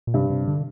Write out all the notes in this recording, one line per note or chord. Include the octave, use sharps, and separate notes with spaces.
A#2
G2 C3
C3
D3